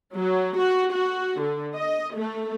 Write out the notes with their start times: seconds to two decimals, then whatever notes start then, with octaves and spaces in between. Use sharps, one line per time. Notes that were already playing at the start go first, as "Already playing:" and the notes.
0.15 F#3
0.58 F#4
0.92 F#4
1.40 D3
1.76 D#5
2.15 A3